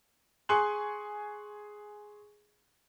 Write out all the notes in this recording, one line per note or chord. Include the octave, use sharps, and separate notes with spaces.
G#4 G#5 C6 C#6 F#6 F#7